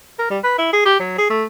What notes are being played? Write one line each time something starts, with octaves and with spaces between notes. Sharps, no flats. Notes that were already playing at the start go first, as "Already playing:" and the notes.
A#4
G3
B4
E4
G#4
G4
F#3
G#4
A3